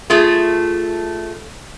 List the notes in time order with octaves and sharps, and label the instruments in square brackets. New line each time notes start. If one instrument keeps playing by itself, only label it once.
[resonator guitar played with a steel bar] A3 F4 G#4